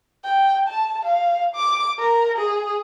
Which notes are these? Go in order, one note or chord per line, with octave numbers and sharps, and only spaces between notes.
G5
A5
F5
D6
A#4
G#4